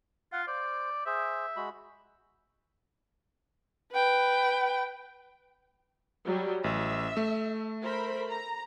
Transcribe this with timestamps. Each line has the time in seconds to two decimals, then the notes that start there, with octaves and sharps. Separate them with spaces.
0.32 F4 F5 F#5
0.47 C5 D5
1.06 G#4 C5 E5
1.56 G#3 F#4 B5
3.92 B4 G5
6.24 F#3 G3
6.64 A1 E5
7.17 A3
7.82 A#4 C5 B5
8.29 A#5